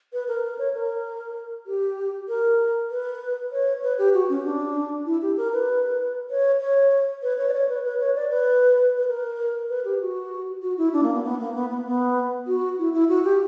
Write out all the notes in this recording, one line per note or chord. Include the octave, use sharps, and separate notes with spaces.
B4
A#4
A#4
C#5
A#4
G4
A#4
B4
C#5
B4
G4
F#4
C#4
D4
E4
G4
A#4
B4
C#5
C#5
B4
C#5
D5
C#5
B4
B4
C#5
D5
B4
B4
A#4
B4
G4
F#4
F#4
E4
D4
A#3
B3
B3
A#3
B3
B3
B3
F#4
E4
E4
F#4
G4